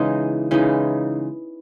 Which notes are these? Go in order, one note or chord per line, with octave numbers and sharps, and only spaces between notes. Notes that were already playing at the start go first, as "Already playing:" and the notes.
Already playing: C#3 E3 G#3 D#4
C#3 E3 G#3 D#4